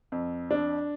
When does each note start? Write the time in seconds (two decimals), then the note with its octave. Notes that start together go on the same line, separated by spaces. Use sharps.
0.12 F2
0.51 D4